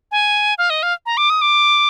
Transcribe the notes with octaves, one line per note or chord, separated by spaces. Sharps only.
G#5
F5
D#5
F5
A#5
D6
D#6
D6